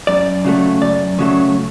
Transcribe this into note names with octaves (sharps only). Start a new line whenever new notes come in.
F#2 D5
C#3 F#3 A3
F#2 D5
C#3 F#3 A3